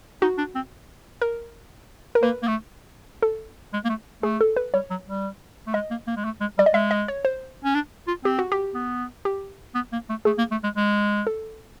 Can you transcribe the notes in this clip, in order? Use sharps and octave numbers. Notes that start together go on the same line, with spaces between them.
D#4 F#4
D4
C4
A#4
A#4
A#3 B4
A#3
A3
A4
G#3
A#3
A3
A3 G#4
A4
B4
G3 C#5
F#3
G3
A3
G#3 D#5
A#3
A#3
G#3
A3
G#3
G3 D5
D#5
G#3 E5
D#5
C#5
C5
C#4
D4
F4
C4 G4
F#4
G4
B3
G4
B3
A#3
A3
A3 G#4
A#3
A3
G#3
G#3
A4